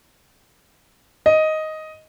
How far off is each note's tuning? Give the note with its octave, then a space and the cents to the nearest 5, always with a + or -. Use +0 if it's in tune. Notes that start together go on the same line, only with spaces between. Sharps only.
D#5 +5